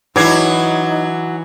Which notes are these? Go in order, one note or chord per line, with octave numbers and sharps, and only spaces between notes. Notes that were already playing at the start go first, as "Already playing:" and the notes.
E3 F#3 D#4 E4 D6 G#6 C7